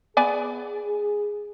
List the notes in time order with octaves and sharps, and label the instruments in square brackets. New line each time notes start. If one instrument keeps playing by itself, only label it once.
[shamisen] B3 D5 G#5 [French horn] G#4